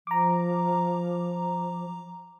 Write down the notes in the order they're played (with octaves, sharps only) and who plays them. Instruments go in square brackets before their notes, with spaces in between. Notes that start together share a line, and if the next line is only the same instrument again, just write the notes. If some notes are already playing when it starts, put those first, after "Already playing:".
[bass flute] F3 [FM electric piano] A#5 D6